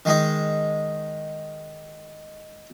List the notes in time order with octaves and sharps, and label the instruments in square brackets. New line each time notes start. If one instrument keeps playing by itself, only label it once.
[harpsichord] D#3 G#3 D#4